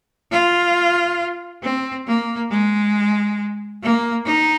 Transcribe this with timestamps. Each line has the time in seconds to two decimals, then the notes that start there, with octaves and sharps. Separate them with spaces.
0.32 F4
1.63 C4
2.07 A#3
2.50 G#3
3.83 A#3
4.26 D#4